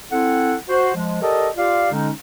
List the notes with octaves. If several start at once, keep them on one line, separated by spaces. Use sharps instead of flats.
C4 E4 A4 F#5
F#4 C5
F3 G#3
G4 A4 A#4 D5 D#5
F4 G4 D5 F5
D3 G#3 C#4 D#4